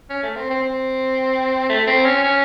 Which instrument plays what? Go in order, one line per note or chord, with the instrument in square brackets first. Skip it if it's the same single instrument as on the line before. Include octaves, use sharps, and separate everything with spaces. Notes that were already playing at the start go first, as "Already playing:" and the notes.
[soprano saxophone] C#4
A3
C4
C4
C4
A3
C4
C#4
C#4